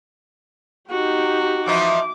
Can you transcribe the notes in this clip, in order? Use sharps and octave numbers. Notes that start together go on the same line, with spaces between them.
D#4 F#4 G4
E3 F3 D#4 D6